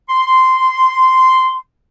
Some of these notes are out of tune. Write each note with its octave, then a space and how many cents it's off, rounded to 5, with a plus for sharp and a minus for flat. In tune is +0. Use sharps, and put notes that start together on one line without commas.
C6 -10